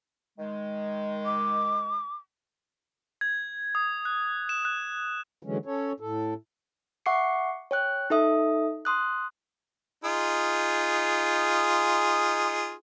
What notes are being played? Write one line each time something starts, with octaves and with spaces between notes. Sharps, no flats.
D#3 G#3
D6
G#6
D#6
F#6
E7
F#6
D3 E3 F#3 G#3 C#4
C#4 A4 C#5
A2 A4
E5 F#5 C#6 D6 C7 C#7
C#5 G5 F#6
D#4 A4 E5 D#6
C6 D#6 F#6
D#4 F4 G#4